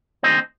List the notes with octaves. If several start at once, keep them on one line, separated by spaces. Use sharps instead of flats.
D#3 A3 C4 C5 D#5